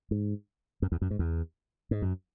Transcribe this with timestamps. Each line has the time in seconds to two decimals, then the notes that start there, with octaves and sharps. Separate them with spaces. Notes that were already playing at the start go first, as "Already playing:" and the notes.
0.11 G#2
0.82 F#2
0.92 E2
1.02 F#2
1.11 G#2
1.19 E2
1.91 G#2
2.02 F#2